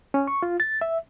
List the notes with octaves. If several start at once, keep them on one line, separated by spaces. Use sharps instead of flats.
C#4
C#6
F4
A6
E5